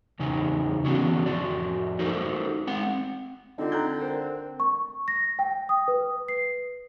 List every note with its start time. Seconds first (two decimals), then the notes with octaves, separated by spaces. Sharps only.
0.19 E2 C#3 D#4 G#5
0.85 D3 E3 B3 C#4 D4 F#4
1.26 F2 F#4 D5
1.99 D#4 F#4 A4 A#4 C5
2.67 G#3 C4 F#5
3.58 D3 C4 D#4 F4
3.72 A#5 F#6 G6
4.00 A#4 C5
4.60 C#6
5.08 A#6
5.39 G5
5.69 D#6
5.88 B4
6.28 C7